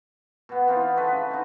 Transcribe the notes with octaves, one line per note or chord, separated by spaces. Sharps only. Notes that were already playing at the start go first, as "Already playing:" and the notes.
B2 B3
E3 C4 D#4 F4
F#4 A4 B4
C#3
C4 D#4